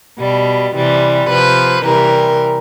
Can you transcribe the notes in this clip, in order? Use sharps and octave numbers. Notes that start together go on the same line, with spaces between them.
B2 G3
C3 E3 G3
C3 F3 B4
C3 E3 G3 A#4